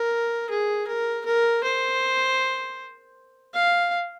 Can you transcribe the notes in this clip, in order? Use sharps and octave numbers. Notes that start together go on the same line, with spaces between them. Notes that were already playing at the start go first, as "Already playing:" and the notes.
Already playing: A#4
G#4
A#4
A#4
C5
F5